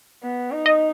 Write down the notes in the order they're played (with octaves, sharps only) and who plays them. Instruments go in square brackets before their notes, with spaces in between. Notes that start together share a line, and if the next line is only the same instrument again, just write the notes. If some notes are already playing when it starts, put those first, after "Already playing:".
[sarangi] B3
D#4
[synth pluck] D#5